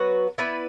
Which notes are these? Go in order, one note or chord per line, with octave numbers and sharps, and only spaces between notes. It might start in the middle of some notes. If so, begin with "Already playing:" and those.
Already playing: F#3 B3 F#4 B4
B3 E4 B4 D5